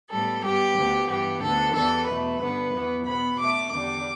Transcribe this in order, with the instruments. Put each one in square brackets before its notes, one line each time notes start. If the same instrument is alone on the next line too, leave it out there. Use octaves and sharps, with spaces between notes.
[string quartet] A2 G3 B3 A4
G2 G3 B3 G4
D2 D3 B3
G2 E3 B3 G4
D2 D3 B3 A4
E2 E3 G3 B3 A4
E2 B2 A3 B4
G2 D3 B3
E2 E3 B3
B2 B3 B5
B2 A3 D6
E2 D3 G3 D6